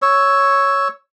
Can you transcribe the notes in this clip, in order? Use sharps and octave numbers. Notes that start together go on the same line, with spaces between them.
C#5 E6